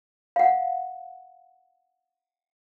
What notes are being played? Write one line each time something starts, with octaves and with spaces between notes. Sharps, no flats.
F5 F#5